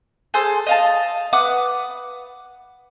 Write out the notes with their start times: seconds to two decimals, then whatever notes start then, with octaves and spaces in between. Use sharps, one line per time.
0.34 G#4 A4 C5
0.67 D#5 F5 A5
1.33 B4 F#5 D6 D#6